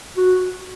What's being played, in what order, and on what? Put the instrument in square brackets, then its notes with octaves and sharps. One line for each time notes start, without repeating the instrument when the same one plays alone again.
[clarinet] F#4